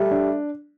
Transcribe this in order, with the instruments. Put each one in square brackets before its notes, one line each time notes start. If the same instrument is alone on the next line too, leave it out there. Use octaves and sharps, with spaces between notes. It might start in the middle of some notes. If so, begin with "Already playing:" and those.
Already playing: [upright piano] G3 [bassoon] A3
[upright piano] D4